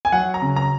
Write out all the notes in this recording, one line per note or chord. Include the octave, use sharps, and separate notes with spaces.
G#5
F#3 F#5
A#5
C#3
A#5